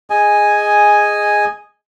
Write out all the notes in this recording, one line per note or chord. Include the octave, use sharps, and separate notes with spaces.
G#4 D#5 G#5